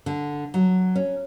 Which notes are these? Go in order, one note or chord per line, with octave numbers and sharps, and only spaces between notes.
D3
F#3
C#4